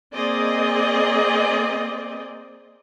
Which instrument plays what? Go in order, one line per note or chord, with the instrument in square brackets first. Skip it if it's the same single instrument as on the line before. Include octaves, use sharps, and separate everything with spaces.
[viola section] A#3 C4 G#4 D5 D#5